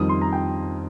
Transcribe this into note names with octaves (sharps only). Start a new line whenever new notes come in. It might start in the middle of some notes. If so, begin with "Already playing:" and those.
Already playing: F2 D#3 G3 D#6
C6
A#5
G5